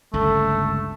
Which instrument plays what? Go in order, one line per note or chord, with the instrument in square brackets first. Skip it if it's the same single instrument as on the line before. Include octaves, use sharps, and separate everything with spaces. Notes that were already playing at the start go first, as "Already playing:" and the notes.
[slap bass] G1 C#2 D3 [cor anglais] A3 [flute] A4